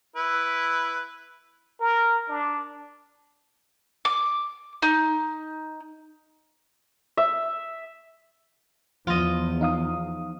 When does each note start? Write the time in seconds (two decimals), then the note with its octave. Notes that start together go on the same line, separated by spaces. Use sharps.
0.16 E4 B4
1.81 A#4
2.29 D4
4.05 D6
4.82 D#4
7.17 E5
9.07 E2 F3 F4 D#5
9.61 D#4 F5 D#6